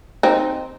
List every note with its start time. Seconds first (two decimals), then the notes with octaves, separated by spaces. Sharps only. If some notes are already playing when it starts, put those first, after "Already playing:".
0.23 C4 D#4